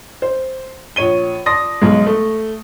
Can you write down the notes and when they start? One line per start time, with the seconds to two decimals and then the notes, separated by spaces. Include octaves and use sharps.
0.22 C5
0.96 A#1 C#5 D#7 G7
1.46 D5 A5 C6 D#6 A#6
1.82 B1 G#3
2.07 A3